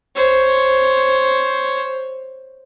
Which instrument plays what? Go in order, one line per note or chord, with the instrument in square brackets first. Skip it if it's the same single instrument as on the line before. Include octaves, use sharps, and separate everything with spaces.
[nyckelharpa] C5 C#5